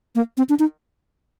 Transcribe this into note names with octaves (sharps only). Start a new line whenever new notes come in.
A#3
C4
D4
D#4